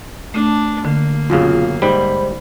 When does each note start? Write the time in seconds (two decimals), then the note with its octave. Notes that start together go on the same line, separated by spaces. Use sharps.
0.34 A3 D4
0.85 D3 A#3
1.30 B1 F#2 C#3 F4 G#4
1.82 G#2 G3 C5 B5